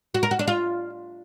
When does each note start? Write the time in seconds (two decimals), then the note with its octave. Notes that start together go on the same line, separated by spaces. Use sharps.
0.14 F#4
0.23 A#4
0.31 F#4
0.39 D4
0.47 F4